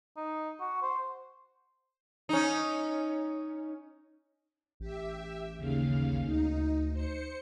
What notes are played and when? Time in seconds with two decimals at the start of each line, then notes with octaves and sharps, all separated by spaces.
0.16 D#4
0.60 F#4
0.82 C5
2.29 C#4 D#4
4.80 A1 G4 E5
5.57 D#2 C#3 F5
6.26 D2 D#4
6.92 C5 C#7